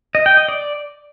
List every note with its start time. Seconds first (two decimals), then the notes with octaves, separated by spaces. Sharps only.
0.15 D#5
0.26 G5
0.37 D#5
0.49 D5